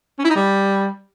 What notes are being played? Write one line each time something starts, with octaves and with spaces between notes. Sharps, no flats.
C#4
E4
D#4
G3